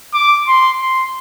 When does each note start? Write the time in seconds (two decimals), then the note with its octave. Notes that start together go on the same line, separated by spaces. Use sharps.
0.14 D6
0.47 C6
0.81 C6